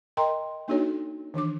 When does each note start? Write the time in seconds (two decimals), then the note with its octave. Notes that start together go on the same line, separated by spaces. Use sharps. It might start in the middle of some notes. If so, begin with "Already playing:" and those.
0.17 A#4 D#5 G5 A#5 C6
0.68 A#3 D4 D#4 F#4 A4 C#5
1.34 D#3 E3 D4 D6